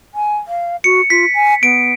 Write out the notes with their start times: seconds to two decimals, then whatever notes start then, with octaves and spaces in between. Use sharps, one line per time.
0.15 G#5
0.48 F5
0.84 F#4 C#7
1.10 F4 B6
1.34 G#5
1.63 B3 D7